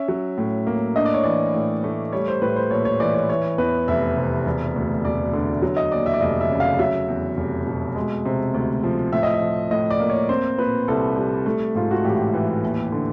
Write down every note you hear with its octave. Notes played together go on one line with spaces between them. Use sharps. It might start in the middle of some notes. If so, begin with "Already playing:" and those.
Already playing: C#4 E5
F#3
A2
A#3
D4 D#5
D5
C#5
E3 D5
A2
A3
G3 C#5
C5
A2 B4
C5
A#1 C#5
C#5
E3 D5
C#5
E3 C#5
E2 B4
F1 E5
C3
E1
D2
E1 D5
D3
F#3
D#5
D#2 D5
E5
D5
F1 D#5
E5
C#3
F5
F#3 E5
E2
F1
B2
G#3
C3
D2
F3
A2 E5
D#5
E5
F3
A2 D#5
D5
A#3
C#5
C4 C5
A#2 B4
C2 A4
G3
A3
G#2 F4
F#4
A1 G4
E3
D#2
D3